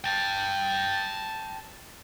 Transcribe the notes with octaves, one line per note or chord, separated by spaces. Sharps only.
G5 A5